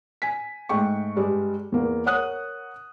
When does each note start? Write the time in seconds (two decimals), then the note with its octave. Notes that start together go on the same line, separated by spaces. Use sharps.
0.22 G#5 B6
0.69 G#2 A3 G#4 G5 C#6
1.16 G2 G3 G#3
1.72 E2 A#3
2.05 A#4 C#5 F#5 D#6 F#6